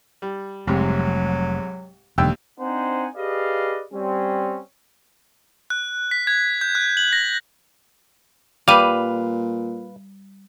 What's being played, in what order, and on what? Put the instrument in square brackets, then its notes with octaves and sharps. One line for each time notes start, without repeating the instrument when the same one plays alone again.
[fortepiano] G3
[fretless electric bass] F1 [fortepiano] C2 G#2 C3 [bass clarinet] F#3
[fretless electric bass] E1 D3 [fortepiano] D#2 G5 E6
[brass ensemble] C4 D4 D#4 C5 F#5 G#5
G4 G#4 B4 D5 D#5 F5
G3 C4 C#4
[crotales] F#6
B6
G#6
G6
F#6
F#7
A#6
[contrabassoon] A#2 [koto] G3 [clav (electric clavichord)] B4 F5 [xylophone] D6 D#7